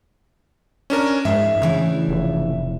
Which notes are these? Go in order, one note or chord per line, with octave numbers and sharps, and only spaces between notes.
C#4 D4 A#4
G#2 G#3 F4 E5
A2 C#3 E3 D4
F1